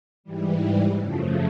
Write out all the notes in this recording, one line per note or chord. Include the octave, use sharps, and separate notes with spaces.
G#2 E3 G3
F#2 C#3 F3 A3